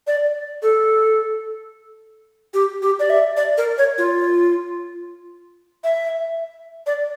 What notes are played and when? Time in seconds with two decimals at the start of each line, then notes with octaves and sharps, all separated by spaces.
0.07 D5
0.62 A4
2.54 G4
2.82 G4
3.00 D5
3.10 E5
3.37 D5
3.58 A#4
3.78 C#5
3.98 F4
5.84 E5
6.87 D5